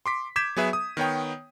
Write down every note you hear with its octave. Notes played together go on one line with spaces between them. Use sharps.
C6 D6 B6
D6 G6 G#6 B6 E7
F#3 B3 G#4 B4 E5
D#6
D#3 B3 C#5 G5